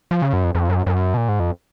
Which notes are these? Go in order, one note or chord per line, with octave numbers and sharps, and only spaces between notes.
F3
C#3
F#2
F2
F2
F#2
F#2
B2
A#2
G#2
F2